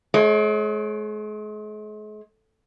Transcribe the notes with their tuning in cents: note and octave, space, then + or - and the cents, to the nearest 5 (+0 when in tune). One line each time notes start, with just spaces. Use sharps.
G#3 +40 C#5 -30